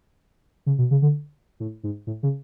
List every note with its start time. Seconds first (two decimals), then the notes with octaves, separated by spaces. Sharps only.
0.66 C#3
0.78 B2
0.91 C#3
1.02 D3
1.60 A2
1.83 G#2
2.07 A2
2.23 C#3